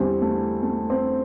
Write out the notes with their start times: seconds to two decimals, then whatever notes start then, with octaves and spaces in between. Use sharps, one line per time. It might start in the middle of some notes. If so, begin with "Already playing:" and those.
Already playing: E2 D3 G3 C4
0.22 A3
0.63 A3
0.90 C4